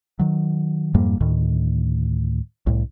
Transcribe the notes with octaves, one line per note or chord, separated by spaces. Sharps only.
D#3 F#3
F2 G#2 G3 A#3
D2 A2 D#3
C2 A2